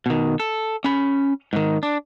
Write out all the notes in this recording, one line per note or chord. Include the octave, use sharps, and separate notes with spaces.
B2 D#3
A4
C#4 B5
G#2 D#3
D4